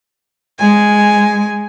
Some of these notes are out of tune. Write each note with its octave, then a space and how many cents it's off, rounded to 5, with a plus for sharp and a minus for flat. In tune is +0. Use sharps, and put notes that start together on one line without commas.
G#3 +0 G#5 +0